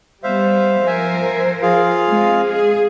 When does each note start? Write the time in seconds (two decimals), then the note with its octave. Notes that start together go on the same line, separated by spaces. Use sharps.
0.24 G3 B3 C5 E5 F5
0.87 F3 A#4 C5 E5 G#5
1.63 F4 G#4 F5
2.08 G#3 C4
2.46 G#4